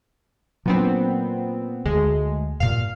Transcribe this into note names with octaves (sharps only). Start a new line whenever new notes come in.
A#2 F#3 B3 C4 D4
D2 G#3
G2 A#2 F5